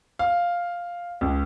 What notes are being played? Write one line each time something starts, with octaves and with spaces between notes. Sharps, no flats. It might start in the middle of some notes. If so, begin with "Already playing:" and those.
F5
C#2